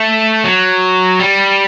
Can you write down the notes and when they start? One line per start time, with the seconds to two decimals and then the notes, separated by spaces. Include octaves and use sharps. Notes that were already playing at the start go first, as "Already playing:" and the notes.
Already playing: A3
0.44 F#3
1.20 G3